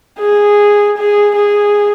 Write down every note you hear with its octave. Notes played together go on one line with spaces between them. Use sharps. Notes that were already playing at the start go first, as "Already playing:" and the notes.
G#4
G#4
G#4